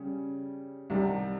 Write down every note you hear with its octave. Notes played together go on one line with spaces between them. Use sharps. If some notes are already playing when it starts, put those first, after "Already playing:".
Already playing: C#3 G3 C#4
C2 C3 D#3 G3